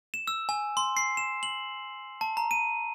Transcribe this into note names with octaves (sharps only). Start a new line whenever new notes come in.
E7
E6
G#5
C6
C7
E7
F#7
A5
A#5
D#7